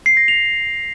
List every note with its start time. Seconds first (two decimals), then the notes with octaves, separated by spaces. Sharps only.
0.06 C7
0.17 A#6
0.28 F7